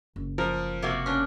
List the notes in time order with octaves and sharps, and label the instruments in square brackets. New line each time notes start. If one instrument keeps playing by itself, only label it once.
[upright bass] F#1
[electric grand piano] F3 [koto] A#4
[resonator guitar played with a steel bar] C3 A#3 F#4
[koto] C#4 D4